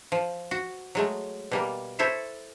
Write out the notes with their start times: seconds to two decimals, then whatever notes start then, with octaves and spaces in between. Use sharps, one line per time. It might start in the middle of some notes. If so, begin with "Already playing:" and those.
0.12 F3
0.51 F#4
0.95 F#3 G#3 A3
1.51 B2 G3 A#3
1.99 E4 A4 C5 C#5 E5